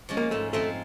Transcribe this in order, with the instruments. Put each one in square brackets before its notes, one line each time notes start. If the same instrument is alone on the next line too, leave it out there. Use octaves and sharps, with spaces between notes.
[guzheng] F3 G#3 C#4
[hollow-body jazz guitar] A#3
[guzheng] G#2 [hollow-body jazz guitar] A3
[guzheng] F3 G#3 C4 [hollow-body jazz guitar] A3